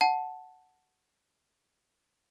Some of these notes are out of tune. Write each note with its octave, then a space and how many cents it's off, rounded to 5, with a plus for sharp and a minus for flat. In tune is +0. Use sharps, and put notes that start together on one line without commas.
F#5 +0 A5 +0